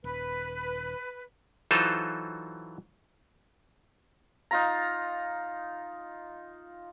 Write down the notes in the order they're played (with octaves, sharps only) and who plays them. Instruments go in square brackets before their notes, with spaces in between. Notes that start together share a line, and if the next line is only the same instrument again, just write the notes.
[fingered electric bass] D#1 [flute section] B4
[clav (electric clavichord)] E3 F#3 D#4 F4 A4 C5
[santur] D#4 F4 A#5